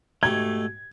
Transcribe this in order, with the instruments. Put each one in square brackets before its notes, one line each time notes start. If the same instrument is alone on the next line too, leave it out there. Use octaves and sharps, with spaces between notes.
[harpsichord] G#2 B2 G4 [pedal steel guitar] A3 [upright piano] G#6